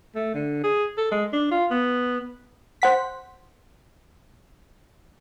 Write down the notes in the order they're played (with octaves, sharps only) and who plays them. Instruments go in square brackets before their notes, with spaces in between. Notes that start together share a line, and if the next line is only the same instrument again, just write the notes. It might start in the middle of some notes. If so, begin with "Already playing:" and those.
[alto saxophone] A3
D3
G#4
A4
G#3
D4
F4
B3
[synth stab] C5 F#5 B6